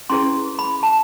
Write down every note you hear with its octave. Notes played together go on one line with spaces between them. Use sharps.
C#4 E4 G#4 B4 C6
B5
A5